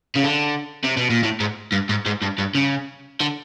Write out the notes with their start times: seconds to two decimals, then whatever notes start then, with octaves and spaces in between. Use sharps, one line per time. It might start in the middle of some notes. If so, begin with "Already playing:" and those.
0.16 C#3
0.24 D3
0.84 C3
0.97 B2
1.10 A#2
1.23 A2
1.40 G#2
1.72 G2
1.89 G#2
2.06 G#2
2.22 G2
2.38 G2
2.55 C#3
3.21 D3